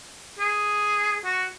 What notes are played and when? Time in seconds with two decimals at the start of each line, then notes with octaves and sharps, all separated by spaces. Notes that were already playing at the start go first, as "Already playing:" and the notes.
0.39 G#4
1.25 F#4